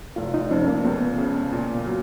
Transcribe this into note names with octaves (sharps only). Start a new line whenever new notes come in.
F1 F4
D#4
F2 C#4
A#3
C#2 B3
C#3
A#2
F#3